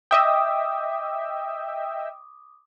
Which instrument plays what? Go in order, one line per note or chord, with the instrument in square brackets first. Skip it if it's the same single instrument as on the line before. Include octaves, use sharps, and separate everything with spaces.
[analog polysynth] D#5 E5 G5 [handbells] D6 D#6